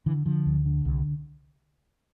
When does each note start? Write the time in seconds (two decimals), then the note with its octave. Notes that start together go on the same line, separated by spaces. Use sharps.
0.06 D3 E3
0.26 D3 F3
0.46 D2
0.66 D3
0.85 C2